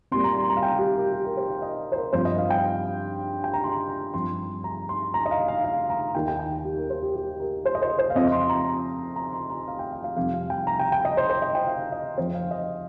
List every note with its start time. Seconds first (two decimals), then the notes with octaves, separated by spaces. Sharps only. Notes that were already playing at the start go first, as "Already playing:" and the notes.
0.11 A#2 G3 C4 C6
0.24 A#5
0.38 C6
0.50 A#5
0.57 F5
0.63 G5
0.79 G4
0.96 A#4
1.12 G4
1.25 A#4
1.37 C5
1.50 F5
1.62 D#5
1.92 C5
1.96 A#4
2.13 G2 F3 C4 C5
2.25 D#5
2.38 F5
2.50 G5
3.44 G5
3.54 A#5
3.64 C6
3.89 A#5
4.14 G2 F3 C4 C6
4.64 A#5
4.89 C6
5.14 A#5
5.26 D#5
5.31 F5
5.48 F5
5.64 F5
5.90 A#5
6.15 D#2 D#3 A#3 G5
6.28 G5
6.39 G5
6.65 G4
6.78 A#4
6.90 C5
7.02 G4
7.16 G4
7.40 A#4
7.65 C5
7.75 D#5
7.82 C5
7.99 C5
8.10 F5
8.15 F2 F3 C4 D#5
8.32 C6
8.49 A#5
9.16 A#5
9.33 C6
9.50 A#5
9.68 F5
9.79 G5
9.92 F5
10.04 F5
10.16 F2 C3 G3 F5
10.34 F5
10.50 G5
10.67 A#5
10.79 G5
10.92 G5
11.05 D#5
11.17 C5
11.30 C5
11.42 D#5
11.55 G5
11.67 F5
11.92 D#5
12.18 F2 F3 C4 C5
12.34 F5
12.51 D#5